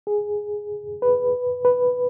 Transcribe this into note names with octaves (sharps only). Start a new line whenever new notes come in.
G#4
B4
B4